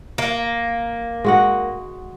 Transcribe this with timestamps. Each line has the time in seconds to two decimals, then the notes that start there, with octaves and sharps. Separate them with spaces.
0.18 A#3
1.24 G#3 F#4 F#5